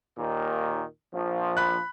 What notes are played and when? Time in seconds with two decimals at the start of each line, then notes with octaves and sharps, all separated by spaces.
0.18 D#2 A#2 D#3
1.14 A#1 F3
1.57 B5 F#6